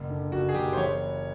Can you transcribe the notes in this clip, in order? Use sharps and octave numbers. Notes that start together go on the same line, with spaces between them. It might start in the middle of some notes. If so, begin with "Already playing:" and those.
Already playing: F#1
D3
F#1 F#4
G#4
F#1 G4
C5
E3 C#5